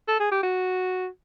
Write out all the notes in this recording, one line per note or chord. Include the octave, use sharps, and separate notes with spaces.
A4
G#4
G4
F#4